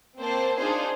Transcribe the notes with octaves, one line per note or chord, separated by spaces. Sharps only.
A#3 C4 C5 A5
D4 D#4 F4 G#4 C5